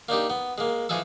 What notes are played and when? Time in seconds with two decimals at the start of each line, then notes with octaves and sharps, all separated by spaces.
0.09 A#3 D4 D#4 G4
0.30 B3
0.58 G#3 A#3
0.89 E3 F3 G#3 G#4 A4